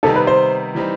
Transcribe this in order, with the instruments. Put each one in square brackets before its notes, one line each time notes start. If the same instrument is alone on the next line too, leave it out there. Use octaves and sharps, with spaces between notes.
[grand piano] C3 D#3 G3 B3 D#4 [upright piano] A4
[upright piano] B4
C5
[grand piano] E3 G3 C4 D#4